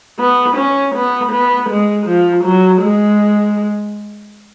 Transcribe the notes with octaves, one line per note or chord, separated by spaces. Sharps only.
B3
C#4
B3
B3
G#3
F3
F#3
G#3